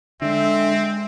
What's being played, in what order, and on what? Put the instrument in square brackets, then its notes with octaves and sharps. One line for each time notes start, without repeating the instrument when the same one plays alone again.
[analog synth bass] D3 [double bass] G#3 [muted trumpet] C4 [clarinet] E5